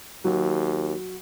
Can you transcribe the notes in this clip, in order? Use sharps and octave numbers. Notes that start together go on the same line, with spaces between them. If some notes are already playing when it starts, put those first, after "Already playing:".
D#2 F#3